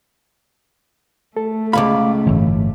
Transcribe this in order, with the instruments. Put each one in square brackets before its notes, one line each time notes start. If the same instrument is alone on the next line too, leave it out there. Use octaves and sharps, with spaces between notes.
[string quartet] A3 [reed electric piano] A4
[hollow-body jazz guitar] C#2 G#2 B5 [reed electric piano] F5 D6
[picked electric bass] G1 E3 [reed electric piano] A2